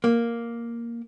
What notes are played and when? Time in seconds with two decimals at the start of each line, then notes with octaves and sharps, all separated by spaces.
0.04 A#3